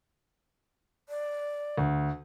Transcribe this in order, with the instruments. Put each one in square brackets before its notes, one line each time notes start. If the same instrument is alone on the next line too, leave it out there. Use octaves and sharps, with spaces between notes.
[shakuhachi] D5
[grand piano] D2